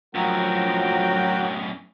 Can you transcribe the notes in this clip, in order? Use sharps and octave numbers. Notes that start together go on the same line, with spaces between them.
F#2 A2 F3 F#3 F#4 A#4 G5